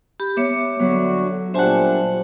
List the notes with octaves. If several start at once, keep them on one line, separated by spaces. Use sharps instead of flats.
G4 B5
B3 C#5 E5 D6
D3 F#3 B3 F#4
A#2 G3 D4 C5 E5 F#5 G#5 A5